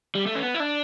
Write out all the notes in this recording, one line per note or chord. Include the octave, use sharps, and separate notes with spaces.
G3
A3
C#4
B3
E4
D4